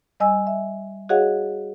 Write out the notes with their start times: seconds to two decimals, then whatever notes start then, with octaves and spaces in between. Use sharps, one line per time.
0.20 G3 D#5 G#5 E6
0.47 E5
1.09 F#4 G#4 C#5 D#5 F5 F#5